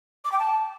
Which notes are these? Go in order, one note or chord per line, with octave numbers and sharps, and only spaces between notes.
D6
G5
A5